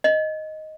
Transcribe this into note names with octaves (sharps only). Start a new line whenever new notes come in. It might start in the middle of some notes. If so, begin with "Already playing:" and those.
D#5